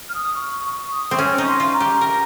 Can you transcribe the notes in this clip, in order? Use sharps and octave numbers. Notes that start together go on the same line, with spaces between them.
F6
D#6
C#6
C#6
D#6
C4
C#4 C#6
D#4
C6
F4
A#5
G4
A#4